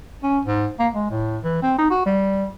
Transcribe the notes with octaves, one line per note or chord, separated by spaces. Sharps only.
C#4
G#2
A#3
G#3
A2
E3
C4
D#4
F#4
G3